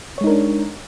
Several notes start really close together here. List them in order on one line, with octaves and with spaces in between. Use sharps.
C#5 G#3 D#4 A#4 D4